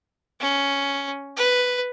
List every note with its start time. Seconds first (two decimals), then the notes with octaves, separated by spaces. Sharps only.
0.40 C#4
1.37 B4